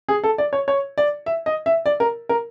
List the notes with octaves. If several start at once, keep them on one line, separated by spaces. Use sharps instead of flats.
G#4
A4
D5
C#5
C#5
D5
E5
D#5
E5
D5
A#4
A#4